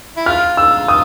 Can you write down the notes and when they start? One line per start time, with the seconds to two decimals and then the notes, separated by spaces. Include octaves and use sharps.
0.17 E4
0.26 F4 F6
0.57 E6
0.88 D#6